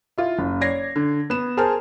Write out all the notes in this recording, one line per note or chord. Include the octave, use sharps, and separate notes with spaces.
E4 F4
F#1
C#5 D5 G#6 A#6 C7
D3
B3 E7
G#4 A#4 C5 G#5 A5 F6